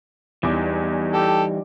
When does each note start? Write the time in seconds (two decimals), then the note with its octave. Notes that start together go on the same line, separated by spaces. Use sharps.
0.43 E2 E3 G3 D#4 D6
1.14 G4 A4